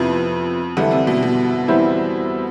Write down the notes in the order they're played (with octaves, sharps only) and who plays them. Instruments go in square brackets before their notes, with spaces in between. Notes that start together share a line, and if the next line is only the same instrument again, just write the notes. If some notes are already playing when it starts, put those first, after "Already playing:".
Already playing: [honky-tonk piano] F2 [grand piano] C3 F3 B3 E4 B4
[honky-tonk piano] D3 [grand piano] E3 G3 D4 A4 E5
[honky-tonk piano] C3
B2
B2
[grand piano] E3 G3 C4 E4